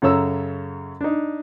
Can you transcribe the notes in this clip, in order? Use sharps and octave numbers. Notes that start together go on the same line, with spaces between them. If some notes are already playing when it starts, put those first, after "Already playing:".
F#2 C#3 A4 C#5 A#5 E6
D4 D#4